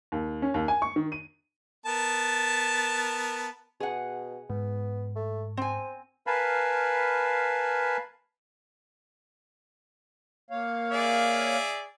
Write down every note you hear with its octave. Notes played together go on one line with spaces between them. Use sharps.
D#2
C#4
D#2
G#5
C#6
D#3
D#7
B3 A#4 A5
B2 G#4 F#5
G#2 B3
A3
C4 C5 G#5
A#4 B4 F5 G#5 A5 B5
A#3 C#5 F5
G#4 D5 E5